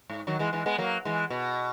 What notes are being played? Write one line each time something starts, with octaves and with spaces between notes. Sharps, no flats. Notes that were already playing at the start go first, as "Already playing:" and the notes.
G#2
D#3 F#3
E3 G#3
E3 G#3
G#3 B3
F#3 A#3
E3 G#3
B2